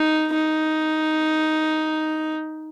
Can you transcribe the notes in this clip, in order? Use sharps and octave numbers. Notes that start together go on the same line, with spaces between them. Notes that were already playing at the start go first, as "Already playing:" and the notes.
Already playing: D#4
D#4